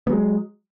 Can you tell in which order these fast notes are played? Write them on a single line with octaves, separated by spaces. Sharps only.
B3 F#3 G#3